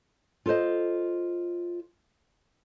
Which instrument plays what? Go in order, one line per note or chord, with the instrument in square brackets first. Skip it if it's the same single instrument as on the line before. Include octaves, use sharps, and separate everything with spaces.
[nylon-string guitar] F4 A4 A#4 C5 D#5